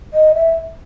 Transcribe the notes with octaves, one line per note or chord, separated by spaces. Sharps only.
D#5
E5